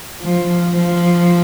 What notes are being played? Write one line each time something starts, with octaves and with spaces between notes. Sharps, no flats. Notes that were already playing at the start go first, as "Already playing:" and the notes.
F3
F3